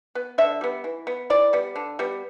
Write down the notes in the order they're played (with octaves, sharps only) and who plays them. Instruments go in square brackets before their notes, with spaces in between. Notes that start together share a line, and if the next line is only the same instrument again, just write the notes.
[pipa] B3
D3 E5
G3 B3
E3
B3
E3 D5
G3 B3
D3
G3 B3